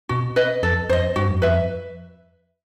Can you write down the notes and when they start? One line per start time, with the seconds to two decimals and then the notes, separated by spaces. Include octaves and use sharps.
0.09 B2 F#4
0.36 B4 D#5
0.63 F2 A4
0.89 F2 C5 D#5
1.16 G2 F#4
1.30 F#2
1.42 F2 B4 E5